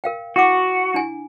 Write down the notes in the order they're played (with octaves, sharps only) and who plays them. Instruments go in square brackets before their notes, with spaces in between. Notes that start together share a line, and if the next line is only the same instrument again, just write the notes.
[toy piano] A#4 F5 G5
[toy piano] E4 F#5 D6 [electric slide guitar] F#4
[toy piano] D4 E4 G#5